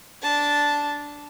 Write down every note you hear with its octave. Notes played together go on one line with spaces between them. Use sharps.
D4 A5